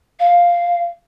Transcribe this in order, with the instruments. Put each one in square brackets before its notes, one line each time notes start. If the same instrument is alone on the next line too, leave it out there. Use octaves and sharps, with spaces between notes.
[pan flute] F5